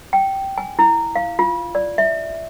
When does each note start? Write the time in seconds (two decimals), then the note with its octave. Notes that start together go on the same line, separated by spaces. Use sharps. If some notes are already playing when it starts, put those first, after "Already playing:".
0.13 G5
0.58 G#5
0.79 E4
1.16 F5
1.39 F4
1.75 D5
1.98 E5